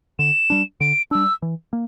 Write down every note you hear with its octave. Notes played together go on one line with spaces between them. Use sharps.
D3 E7
G3 D4
D3 D7
G3 D4 E6
E3
A#3